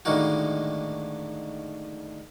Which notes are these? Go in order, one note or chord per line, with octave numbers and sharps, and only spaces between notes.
A2 D3 D#3 G#3 A#3 F#4